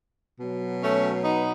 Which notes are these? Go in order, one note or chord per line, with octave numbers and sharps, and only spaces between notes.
B2 F#3
A3 C#4
B3 D#4